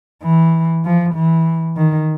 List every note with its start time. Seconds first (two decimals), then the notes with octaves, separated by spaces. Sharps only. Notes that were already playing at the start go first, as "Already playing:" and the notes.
0.23 E3
0.85 F3
1.15 E3
1.77 D#3